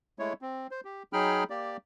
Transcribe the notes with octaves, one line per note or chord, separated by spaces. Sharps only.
G#3 A3 E4 C#5
C4
C5
G4
F#3 D#4 G#4 G5 B5 F6
A#3 G4 D5